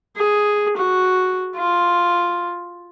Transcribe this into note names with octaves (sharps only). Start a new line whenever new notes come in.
G#4
F#4
F4